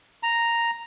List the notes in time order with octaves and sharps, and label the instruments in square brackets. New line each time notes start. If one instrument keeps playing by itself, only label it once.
[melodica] A#5